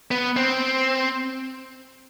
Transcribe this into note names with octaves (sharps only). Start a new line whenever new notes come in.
B3
C4